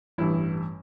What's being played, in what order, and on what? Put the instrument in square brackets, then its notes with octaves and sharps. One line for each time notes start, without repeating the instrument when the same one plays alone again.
[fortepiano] A1 G2 E3 E4